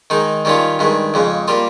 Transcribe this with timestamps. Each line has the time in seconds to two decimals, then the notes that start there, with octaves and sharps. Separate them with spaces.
0.10 D#3 G#3 D#4
0.45 D#3 G3 C#4 F4
0.79 G2 D#3 G#3
1.14 F2 C#3 G#3
1.48 G3 A#3 F4